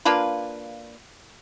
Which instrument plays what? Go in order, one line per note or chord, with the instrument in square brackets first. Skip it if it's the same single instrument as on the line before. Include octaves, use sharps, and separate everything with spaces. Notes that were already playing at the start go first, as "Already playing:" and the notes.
[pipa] A#3 D4 F4 B4